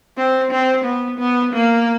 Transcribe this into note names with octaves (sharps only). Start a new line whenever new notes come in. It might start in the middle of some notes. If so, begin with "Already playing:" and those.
C4
C4
B3
B3
A#3